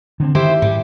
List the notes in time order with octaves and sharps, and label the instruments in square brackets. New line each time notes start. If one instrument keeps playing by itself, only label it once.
[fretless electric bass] D3 C4
[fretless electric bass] D#3 [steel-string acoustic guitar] E4 G4 C5
[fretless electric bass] G#2 [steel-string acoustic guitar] G3